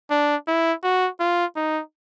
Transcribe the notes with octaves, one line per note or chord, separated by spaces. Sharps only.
D4
E4
F#4
F4
D#4